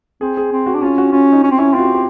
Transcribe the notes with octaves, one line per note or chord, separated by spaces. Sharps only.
C4 G#4
G#4
C4
F#4
D4
C#4 F4
F#4
C#4 F4
D#4
C#4
C4
C#4 E4
C4 F4
F#4
G4
G4